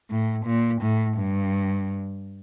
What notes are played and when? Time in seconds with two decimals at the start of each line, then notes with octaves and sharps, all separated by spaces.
0.10 A2
0.45 A#2
0.81 A2
1.17 G2